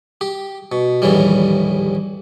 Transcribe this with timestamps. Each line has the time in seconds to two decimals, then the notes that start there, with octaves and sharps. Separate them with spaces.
0.21 G4
0.72 B2
1.02 A#1 D#2 A2 E3 G3